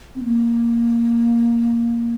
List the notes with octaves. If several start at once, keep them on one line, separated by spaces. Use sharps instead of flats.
C4
A#3